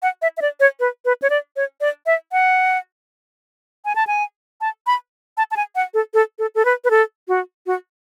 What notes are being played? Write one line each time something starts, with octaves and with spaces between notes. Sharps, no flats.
F#5
E5
E5
D5
C#5
B4
B4
C#5
D5
C#5
D5
E5
F#5
G#5
A5
G#5
A5
B5
A5
A5
G#5
F#5
A4
A4
A4
A4
B4
B4
A4
F#4
F#4